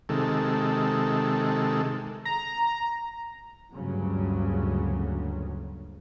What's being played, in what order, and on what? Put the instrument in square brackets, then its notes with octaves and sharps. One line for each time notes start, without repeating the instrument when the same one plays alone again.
[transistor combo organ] C3 D#3 G#3 A4
[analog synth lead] A#5
[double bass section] D2 G2 A#2 C#3 F#3